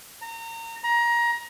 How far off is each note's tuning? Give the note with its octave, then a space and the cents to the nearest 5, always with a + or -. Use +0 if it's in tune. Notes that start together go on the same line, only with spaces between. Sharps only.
A#5 -30
A#5 +25